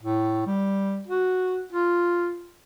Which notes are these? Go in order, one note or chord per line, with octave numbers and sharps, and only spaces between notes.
A2
G3
F#4
F4